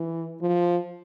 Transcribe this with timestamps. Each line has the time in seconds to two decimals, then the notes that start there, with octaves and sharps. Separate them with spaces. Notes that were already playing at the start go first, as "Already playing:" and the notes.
Already playing: E3
0.41 F3